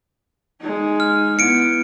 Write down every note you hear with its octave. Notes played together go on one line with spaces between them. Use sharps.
G#3 D#4
F6
B3 E4 C#7 D7